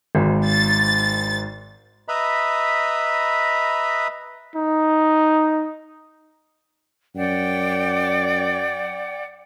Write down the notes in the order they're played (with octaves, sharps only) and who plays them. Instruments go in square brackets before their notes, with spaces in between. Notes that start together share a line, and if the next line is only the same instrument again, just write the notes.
[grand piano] G#1 G#2
[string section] A6
[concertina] B4 D#5 E5 A#5 B5
[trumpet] D#4
[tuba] F#2 [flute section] D5 F#5 G5